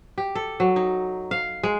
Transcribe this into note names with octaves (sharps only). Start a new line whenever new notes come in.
G4
A4
F#3
D#4
F5
G#3